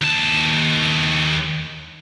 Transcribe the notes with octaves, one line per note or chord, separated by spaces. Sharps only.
D#2 A5